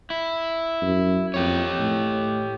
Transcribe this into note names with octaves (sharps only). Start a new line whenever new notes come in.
E4
F#2
F2 G4 C#5
A2